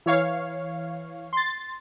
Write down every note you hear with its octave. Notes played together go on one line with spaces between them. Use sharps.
E3 C#5 F5
C6 A6